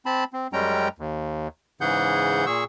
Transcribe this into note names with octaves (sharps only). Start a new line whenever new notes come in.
C4 A5 B5
C4
F#2 G3 G#3 C#4 G5 A#5
D#2
G#2 C#3 E3 G#4 F#5 G6
A#2 G#4 C#6 E6